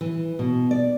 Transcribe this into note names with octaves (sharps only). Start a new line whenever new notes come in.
E3
B2
D5